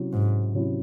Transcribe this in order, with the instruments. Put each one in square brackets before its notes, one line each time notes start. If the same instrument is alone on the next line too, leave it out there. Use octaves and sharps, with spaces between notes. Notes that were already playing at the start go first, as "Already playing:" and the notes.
Already playing: [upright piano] C3 F#3 C#4 E4
[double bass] G#2
[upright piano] C3 F#3 C#4 E4